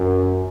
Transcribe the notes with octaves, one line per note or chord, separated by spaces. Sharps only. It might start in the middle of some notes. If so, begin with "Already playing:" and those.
Already playing: F#2